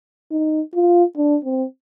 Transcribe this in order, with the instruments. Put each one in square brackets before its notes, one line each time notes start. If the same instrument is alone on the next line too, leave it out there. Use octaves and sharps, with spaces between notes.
[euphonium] D#4
F4
D4
C4